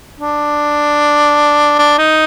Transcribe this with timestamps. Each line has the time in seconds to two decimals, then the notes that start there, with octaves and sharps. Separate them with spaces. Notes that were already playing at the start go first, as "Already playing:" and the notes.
0.20 D4
1.79 D4
1.99 D#4